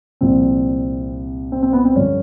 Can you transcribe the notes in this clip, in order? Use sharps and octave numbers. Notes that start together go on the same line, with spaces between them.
C2 A#2 F3 C4
C4
C4
B3
C4
G2 D3 F3 C#4